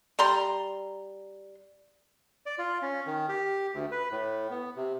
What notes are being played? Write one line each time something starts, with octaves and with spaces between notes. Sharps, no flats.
G3 A#5 C6
D5
F4
C#4
D#3
G4
D2
B4
A2
B3
C3